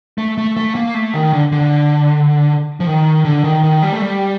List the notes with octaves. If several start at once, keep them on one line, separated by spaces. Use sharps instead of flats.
A3
A3
A3
A#3
A3
D#3
D3
D3
F3
D#3
D3
D#3
D#3
G3
A3
G3